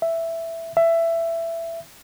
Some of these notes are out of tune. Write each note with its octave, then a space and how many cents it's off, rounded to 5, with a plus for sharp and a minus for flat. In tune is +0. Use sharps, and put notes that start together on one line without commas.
E5 +5
E5 +15